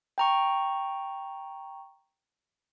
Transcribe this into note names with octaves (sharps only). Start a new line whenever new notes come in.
G5 A#5 C#6